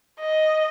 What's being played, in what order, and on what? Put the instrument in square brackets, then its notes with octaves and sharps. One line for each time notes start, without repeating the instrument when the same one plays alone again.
[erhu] D#5